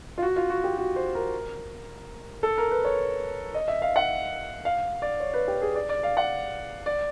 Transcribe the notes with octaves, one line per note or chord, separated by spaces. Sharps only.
F4
F#4
F4
F#4
G4
F#4
C5
A#4
A4
A#4
B4
C#5
D#5
E5
F5
F#5
F5
D5
C#5
B4
G4
G#4
D5
D5
F5
F#5
D5